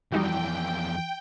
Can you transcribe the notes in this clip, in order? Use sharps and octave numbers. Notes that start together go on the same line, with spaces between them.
F2 E3 G3 D#4 F#4 G5